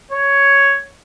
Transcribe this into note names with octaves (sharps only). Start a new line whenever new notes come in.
C#5